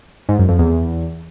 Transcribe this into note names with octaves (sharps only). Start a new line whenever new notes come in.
G#2
F#2
F2
E2